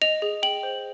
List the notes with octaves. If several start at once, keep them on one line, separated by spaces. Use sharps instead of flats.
D#5 F7
G#4
G5 F#7
C5